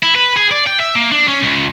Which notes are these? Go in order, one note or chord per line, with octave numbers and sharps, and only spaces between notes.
E4
B4
G#4
D5
G5
E5
A#3
D4
C#4
C#2